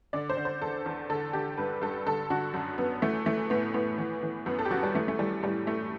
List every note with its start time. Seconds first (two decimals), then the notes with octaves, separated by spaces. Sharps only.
0.13 D3 D5
0.30 C5
0.37 D3
0.45 C5
0.62 E2 A4
0.86 E2
1.10 D3 A4
1.33 D3 G4
1.58 G2 B4
1.82 G2 A4
2.07 D3 A4
2.30 D3 F#4
2.54 F#2
2.78 F#2 B3
3.02 E3 A3
3.26 E3 A3
3.50 A2 B3
3.74 A2 B3
3.98 E3
4.23 E3
4.46 F#2 B3
4.59 A4
4.65 G4
4.71 F#2 F#4
4.83 G3
4.94 E3 A3
5.08 A3
5.19 E3 G3
5.43 A2 G3
5.67 A2 A3